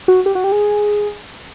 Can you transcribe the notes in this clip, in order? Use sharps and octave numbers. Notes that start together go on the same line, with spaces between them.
F#4
G4
F#4
G4
G#4